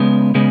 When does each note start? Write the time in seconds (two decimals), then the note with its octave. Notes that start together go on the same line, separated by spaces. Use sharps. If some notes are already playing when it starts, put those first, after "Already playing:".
Already playing: C#3 G#3 B3
0.35 C#3 G#3 B3